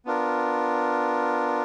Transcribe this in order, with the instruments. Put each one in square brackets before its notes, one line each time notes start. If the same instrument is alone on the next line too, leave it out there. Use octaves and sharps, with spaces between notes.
[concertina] B3 D4 F4 A#4